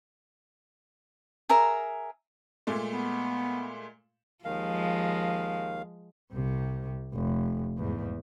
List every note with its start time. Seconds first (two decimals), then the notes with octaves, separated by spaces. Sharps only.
1.49 G#4 A#4 E5 A#5
2.67 A#2 G#3 A3
2.93 B3
4.45 D#2 D#3 F3 G#3 F5
6.33 C2 C3
7.14 F1
7.78 E2 G#2